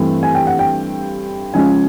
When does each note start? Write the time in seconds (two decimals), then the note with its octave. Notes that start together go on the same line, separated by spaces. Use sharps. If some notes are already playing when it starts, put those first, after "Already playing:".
Already playing: G2 E3 A3 C4
0.23 G#5
0.35 G5
0.47 F#5
0.59 G5
1.54 C#3 F3 G#3 C#4 G#5